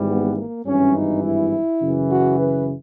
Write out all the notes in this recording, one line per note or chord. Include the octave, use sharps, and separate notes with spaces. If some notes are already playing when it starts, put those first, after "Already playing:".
Already playing: G#1 G#2 E3 G3
B3
A#3
G#1 G2 E3 C#4
D#4
E4
F#2 C#3 E3
F#4
B4